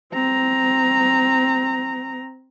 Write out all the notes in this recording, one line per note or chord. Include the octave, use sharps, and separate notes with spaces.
C4 A#5